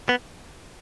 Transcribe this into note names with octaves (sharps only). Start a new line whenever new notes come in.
B3